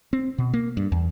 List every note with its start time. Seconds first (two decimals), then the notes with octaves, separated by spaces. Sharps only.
0.13 C4
0.38 B2
0.54 A#3
0.77 G2
0.92 E2